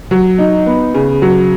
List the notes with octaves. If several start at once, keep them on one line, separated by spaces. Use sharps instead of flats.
F#3
D#4
B3
C#3
F#3